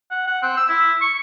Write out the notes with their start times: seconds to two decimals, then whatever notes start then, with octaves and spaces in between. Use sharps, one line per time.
0.11 F#5
0.27 F#5
0.42 C4
0.57 E6
0.69 E4
1.01 C#6